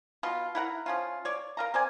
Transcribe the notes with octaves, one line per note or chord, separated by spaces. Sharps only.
B2 F4
E4 A#4 F#5 A#5
F3 C#4 F4
C#5 D5
A#4 F5 A#5
C4 D5 G#5